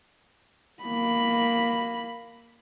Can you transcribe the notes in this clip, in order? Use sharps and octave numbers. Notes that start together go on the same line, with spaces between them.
A#3 B5